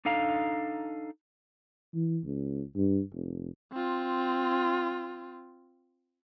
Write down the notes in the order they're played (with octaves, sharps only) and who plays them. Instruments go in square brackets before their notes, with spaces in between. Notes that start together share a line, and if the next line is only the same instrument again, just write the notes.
[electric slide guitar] D4 D#4 A4 F5 A#5
[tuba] E3
C#2
G2
F1
[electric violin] C4 F4